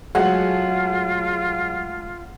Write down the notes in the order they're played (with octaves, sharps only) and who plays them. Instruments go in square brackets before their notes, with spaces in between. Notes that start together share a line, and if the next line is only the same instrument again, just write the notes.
[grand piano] F#3 [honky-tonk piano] G#3 A3 G#4 [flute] F4 [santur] F#5